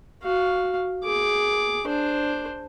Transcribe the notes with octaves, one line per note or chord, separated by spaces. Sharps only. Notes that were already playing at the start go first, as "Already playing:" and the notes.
F#4 F5
G#4 D6
D4 C5